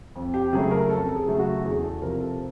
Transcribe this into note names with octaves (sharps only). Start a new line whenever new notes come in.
F2
G4
C#3 F#3 A3 G#4
A#4
F2 A4
A4
G#4
C#3 F#3 A3
F#4
E2 G#4
A4
C3 F3 A#4
A4